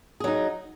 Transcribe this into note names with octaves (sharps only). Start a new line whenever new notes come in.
F#3 D#4 G#4